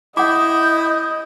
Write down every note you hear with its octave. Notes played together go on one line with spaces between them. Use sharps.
E4 D#5 F#5 D6 D#6 G6